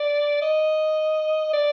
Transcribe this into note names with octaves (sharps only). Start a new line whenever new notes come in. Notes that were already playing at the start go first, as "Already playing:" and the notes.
Already playing: D5
D#5
D5